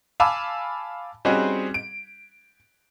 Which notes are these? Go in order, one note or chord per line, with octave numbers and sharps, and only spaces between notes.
F5 G#5 A5 B5 D6 E6
G3 C4 C#4 D#4 F#4 G#4
D7